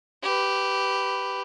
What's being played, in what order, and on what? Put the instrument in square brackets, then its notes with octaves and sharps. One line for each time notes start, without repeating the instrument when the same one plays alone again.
[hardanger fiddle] G4 B4